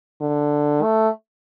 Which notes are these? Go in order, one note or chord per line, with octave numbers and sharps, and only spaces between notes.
D3
A3